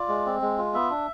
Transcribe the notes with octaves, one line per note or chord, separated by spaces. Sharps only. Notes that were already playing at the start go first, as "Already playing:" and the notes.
Already playing: F4 D5
G#3
C4
G#3
F4
B3 E5
D4